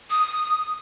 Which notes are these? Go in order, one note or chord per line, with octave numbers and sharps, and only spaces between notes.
D#6